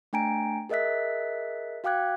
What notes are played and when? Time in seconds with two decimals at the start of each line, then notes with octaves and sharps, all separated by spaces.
0.13 A3 D4 G5 G#5 A#5 D7
0.69 G#4 A#4 D#5 E5 F#6 B6
1.84 F#4 F5 G5 D6 F#6 G#6